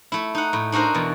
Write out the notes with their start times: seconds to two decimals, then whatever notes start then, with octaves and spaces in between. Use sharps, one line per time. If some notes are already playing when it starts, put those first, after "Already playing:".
0.12 A3 E4
0.35 D#4 F#5
0.53 A2
0.72 D4 D#4 F#4 A#4 C5
0.94 E2 B2